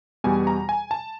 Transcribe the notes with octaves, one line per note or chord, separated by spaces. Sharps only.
E2 B2 G3 G#5
A#5
G#5
A5